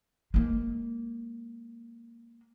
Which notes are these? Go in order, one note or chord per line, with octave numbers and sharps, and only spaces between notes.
G#3 A#3